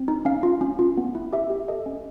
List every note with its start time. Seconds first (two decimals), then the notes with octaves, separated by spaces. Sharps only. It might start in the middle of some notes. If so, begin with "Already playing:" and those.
Already playing: C4
0.08 D#4
0.25 C#4 F5
0.43 F4
0.61 C#4
0.79 F4
0.97 B3
1.15 E4
1.33 G4 E5
1.50 G4
1.68 A4 D#5
1.86 C#4